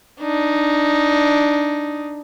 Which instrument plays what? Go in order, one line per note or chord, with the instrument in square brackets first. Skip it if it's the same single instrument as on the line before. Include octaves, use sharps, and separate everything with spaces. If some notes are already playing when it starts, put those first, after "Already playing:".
[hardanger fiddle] D4 D#4